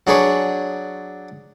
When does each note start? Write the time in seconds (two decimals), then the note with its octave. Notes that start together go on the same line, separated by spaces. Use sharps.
0.07 F#3 D4 G#4 B4 C#5